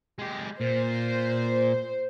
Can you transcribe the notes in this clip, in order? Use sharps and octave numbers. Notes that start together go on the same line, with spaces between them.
G#3 G4
A#2 C5